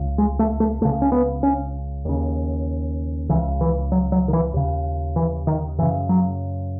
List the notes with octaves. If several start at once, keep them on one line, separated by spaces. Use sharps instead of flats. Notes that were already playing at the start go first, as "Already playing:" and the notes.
Already playing: C#2 C#3
G#3
A3
A3
C#2 C#3 A3
C#4
B3
C#4
D#2 C#3
C#2 C#3 E3
E3
F#3
F#3
D#3
E3
D#2 C#3
E3
D#3
F#2 C#3 E3
F#3